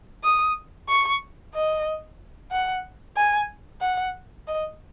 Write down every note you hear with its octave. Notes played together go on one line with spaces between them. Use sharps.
D#6
C#6
D#5
F#5
G#5
F#5
D#5